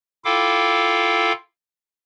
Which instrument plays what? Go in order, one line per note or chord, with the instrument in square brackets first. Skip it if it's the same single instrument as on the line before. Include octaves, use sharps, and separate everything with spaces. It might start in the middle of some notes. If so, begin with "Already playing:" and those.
[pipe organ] E4 F4 A4 F5 G5 D6